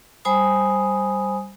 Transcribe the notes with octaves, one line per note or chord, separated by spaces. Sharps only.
G3 C5 G#5 B5 D#6